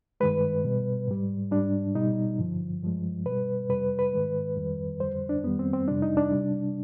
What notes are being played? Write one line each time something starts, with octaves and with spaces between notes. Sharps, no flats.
G2 D#3 G#3 B4
B2 G3
G#2 G3
G#2 G3 D4
B2 G3 D#4
G2 D3 F3
G2 F3 G#3
B2 G3 B4
F2 C3 G3 B4
B4
G#2 D#3 G#3
F2 D#3 G3
F2 D3 G3 C5
D4
F2 D#3 G3 B3
C4
C4
F2 C3 G3 D4
D#4
D4
C3 G3